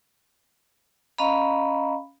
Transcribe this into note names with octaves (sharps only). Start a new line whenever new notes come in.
C#4 D#5 F5 A#5 B5